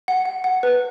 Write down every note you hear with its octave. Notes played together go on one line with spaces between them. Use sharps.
F#5
F#5
F#5
B4